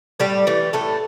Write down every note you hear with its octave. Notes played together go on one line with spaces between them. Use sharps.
A2 G3 G4
E3 A3
A2 A3 A4